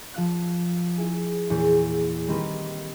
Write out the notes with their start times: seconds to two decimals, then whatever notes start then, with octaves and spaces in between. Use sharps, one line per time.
0.14 F3 F5 F#6
0.97 E4 G#4
1.50 E2 A#2 C#5 F#6
2.28 D#3 G3 A#3 C4 A#4 B4